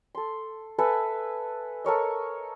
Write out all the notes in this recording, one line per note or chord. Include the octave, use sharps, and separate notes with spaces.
A4 C6
A4 B4 E5 G#5
A4 A#4 C#5 D#5